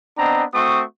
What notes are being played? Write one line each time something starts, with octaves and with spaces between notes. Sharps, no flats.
B3 C4 D4 D#5 A#5
A3 C4 F#4 C#6 D#6